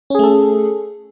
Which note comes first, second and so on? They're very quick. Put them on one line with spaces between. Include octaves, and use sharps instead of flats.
C#4 G#4 A3 A4